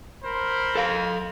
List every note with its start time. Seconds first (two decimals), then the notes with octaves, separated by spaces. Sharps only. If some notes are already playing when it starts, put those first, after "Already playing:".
0.23 A#4 C5 B5
0.75 A4 F5